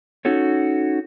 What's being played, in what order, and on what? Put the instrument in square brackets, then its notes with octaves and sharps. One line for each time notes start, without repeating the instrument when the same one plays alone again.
[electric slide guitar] C#4 D#4 F#4 A4 C#5